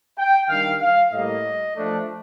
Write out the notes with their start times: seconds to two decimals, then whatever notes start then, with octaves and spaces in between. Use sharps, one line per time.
0.18 G5
0.49 D#3 G3 D4 F5
0.81 F5
1.12 A2 G3 A#3 D#5
1.76 F3 A3 D4